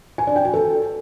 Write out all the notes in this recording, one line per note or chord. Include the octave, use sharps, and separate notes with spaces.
G#5
D4
G5
F#4
A4